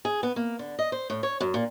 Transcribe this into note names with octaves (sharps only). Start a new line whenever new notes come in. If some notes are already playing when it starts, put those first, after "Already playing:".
G#4
B3
A#3
D3
D#5
C5
A2
C#5
F#2
A#2